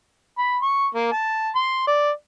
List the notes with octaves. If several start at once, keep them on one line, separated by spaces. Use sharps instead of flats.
B5
C#6
A#3
A5
C6
D5